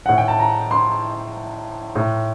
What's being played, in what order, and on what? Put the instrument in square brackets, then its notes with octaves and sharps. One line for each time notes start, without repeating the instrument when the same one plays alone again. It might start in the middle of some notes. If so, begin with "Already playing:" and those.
[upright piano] A2 F#5
G5
A5
A#5
C6
A2